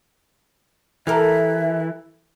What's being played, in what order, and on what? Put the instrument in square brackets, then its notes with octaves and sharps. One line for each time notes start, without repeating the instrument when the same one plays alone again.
[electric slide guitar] E3 [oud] G4 A4 A#4 [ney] E5